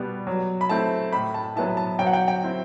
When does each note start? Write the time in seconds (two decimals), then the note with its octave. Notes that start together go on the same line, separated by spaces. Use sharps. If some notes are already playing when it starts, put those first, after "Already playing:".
Already playing: B2 G3 B3
0.27 F#3
0.61 B5
0.69 A3 C4 E4 A5
1.13 A2 B5
1.34 A5
1.56 F#3 B3 E4 A5
1.77 A5
1.99 F#3 G5
2.06 F#5
2.13 G5
2.28 G5
2.43 C4 E4